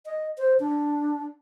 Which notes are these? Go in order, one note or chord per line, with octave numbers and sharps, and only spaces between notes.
D#5
C5
D4